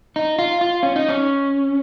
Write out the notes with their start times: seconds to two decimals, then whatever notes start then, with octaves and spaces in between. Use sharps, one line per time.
0.16 D#4
0.39 F4
0.61 F4
0.83 C#4
0.96 D#4
1.09 C#4